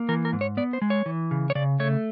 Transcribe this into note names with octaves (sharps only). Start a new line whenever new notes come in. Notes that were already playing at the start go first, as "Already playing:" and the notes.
Already playing: A#3
E3 A#4
A#4
G#2
C#5
B3 D5
C5
G#3
C#5
E3
C#3
C#5
C#3 D5
A3 C#5